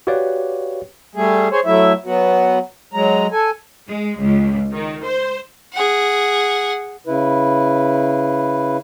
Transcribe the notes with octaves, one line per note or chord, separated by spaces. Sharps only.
F#4 G4 B4 C#5 D5 F5
G3 A3 G#4
G#4 C5 C#5
F#3 A3 E4 E5
F#3 B3 F#4
F#3 G#3 A#5
A4 G#5
G#3
C#2
D#3
C5
G#4 F#5
C#3 E4 B4